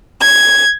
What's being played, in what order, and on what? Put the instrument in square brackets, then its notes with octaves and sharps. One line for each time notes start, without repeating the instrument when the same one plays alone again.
[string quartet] G#6